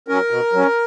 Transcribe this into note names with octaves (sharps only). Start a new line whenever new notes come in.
F#3 C#4 A#4
B2
F#3 C#4